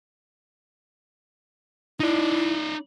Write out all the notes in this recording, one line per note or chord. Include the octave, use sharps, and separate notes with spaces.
D#4 E4 D5